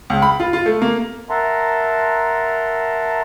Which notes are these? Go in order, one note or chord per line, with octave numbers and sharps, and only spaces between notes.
C#2
B5
F4
F4
A3
A#3
A#4 E5 F#5 A5 A#5 C6